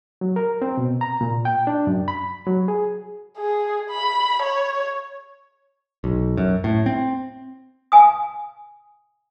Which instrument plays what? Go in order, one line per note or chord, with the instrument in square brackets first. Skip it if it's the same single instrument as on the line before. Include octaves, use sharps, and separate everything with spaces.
[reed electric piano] F#3
A#4
C4
B2
A#5
A#2
G5
D4
F#2
B5
F#3
G#4
[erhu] G#4
B5
C#5
[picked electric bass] B1
F#2
A2
C4
[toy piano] F5 G#5 D#6